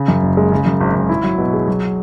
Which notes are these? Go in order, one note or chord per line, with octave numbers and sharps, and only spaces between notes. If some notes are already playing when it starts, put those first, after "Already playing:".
Already playing: C#3
F#2
F#1
G#3
C#3
F#2
G#1
G#1
E4
F#3
B2
G#4
F#3